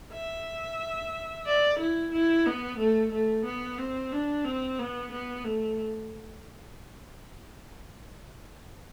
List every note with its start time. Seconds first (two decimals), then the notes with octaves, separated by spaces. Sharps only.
0.12 E5
1.46 D5
1.79 E4
2.12 E4
2.46 B3
2.78 A3
3.12 A3
3.45 B3
3.78 C4
4.12 D4
4.45 C4
4.79 B3
5.11 B3
5.44 A3